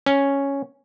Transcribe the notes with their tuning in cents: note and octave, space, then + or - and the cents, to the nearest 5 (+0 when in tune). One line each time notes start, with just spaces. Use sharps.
C#4 +0